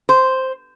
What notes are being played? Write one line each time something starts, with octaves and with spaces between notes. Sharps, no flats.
C5